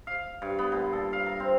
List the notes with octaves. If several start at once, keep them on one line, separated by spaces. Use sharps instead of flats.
F5
G2
B3
A#2
A4
F5
A#4
C4